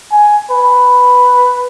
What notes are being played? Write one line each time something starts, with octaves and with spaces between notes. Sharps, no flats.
G#5
B4